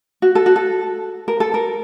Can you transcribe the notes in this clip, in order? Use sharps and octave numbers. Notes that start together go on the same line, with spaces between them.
F#4
A4
F#4
A4
A#4
A4
A#4